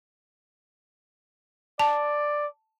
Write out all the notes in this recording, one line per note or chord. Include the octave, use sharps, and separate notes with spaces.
D5 A5